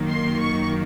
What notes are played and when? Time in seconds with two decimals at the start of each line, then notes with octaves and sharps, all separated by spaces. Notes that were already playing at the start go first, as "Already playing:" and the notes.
Already playing: F#2 D#3 F#3 A#3
0.08 C6
0.40 C#6